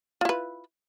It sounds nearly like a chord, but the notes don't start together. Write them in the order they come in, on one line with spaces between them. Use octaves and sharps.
F4 E4 B4